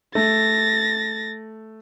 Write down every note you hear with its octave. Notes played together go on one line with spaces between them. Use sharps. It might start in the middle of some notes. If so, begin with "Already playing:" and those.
A3 A6 A#6